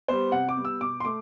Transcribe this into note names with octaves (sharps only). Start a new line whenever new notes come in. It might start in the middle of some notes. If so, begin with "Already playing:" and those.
G3 B3 C5
C3 F#5
D6
G3 B3
E6
B2 D6
C6
A3 D6